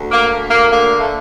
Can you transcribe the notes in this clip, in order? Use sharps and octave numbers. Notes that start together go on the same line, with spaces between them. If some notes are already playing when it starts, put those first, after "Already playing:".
Already playing: D2
A#3
D2
A#3
D3 A#3
A3